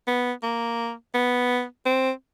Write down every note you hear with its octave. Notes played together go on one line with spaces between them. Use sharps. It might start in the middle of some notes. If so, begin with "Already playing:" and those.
B3
A#3
B3
C4